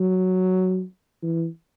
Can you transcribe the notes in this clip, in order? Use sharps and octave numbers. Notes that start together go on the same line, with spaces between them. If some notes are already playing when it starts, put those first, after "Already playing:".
Already playing: F#3
E3